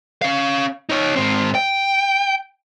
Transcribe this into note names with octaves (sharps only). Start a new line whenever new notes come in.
C#4 F5
D#4 C#5
G#2 C4
G5